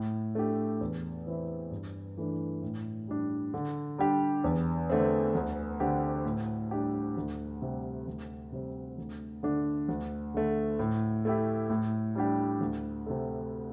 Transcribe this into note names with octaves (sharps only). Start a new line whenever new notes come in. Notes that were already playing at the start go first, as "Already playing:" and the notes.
Already playing: A2
A3 D4 G4
E2
E3 C4 E4
G2
E3 A3 D4
A2
G3 D4
D3
G3 D4 G4
E2
D3 A3 C4
D2
D3 C4 G4
A2
G3 D4 G4
D2
C3 G3
D2
C3 G3 C4
D2
D3 A3 D4
D2
D3 A3
A2
A3 E4 G4
A2
G3 D4 G4
D2
C3 A3